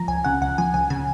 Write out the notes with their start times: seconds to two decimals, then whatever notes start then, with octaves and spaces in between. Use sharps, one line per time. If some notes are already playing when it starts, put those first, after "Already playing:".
Already playing: F3 A#5
0.08 C#2 G#5
0.24 C#3 F#5
0.41 C#2 F#5
0.58 F3 G#5
0.74 C#2 G#5
0.90 C#3 G#5